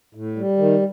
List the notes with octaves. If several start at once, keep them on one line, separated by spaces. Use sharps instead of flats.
A2
G3
D#3